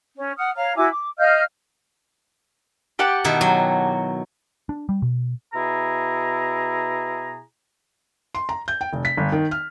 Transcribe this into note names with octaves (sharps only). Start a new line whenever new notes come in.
C#4
F#5 D#6 F6
C#5 F5 A#5 F6
E4 F#4 G#5 D6
D6
D#5 F5 F6 G6
G4 F#5 A5
B2 D#3 E4
F#3
D4
G3
B2
B2 E4 G#4 A#5
C6
A#5
G6
G5
F1
B6
G1
D#3
F6